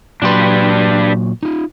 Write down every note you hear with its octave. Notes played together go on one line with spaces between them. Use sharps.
A#2 F#3 D4 G4 B4 C6
D#4 F4